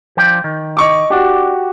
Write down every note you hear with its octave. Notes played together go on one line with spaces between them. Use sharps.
F3 D4 G5
D#3
D#5 C#6 D6
D4 F#4 G4